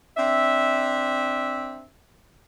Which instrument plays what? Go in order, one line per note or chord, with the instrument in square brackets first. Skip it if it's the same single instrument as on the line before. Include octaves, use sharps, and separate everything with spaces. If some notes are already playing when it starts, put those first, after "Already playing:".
[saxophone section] C4 D4 E5